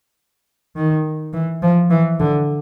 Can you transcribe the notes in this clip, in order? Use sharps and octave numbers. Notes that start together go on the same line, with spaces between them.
D#3
E3
F3
E3
D3